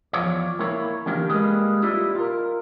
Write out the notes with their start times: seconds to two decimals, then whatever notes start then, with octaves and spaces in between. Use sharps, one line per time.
0.13 E2 F3 C#5 D5
0.59 A#3 E4 C#5
1.06 D3 E3 A#3 G4 A#4
1.30 G3 G#3 A#3 B4 D#5
1.83 E4 F4 G4 B4 D5 D#5
2.15 F4 A#4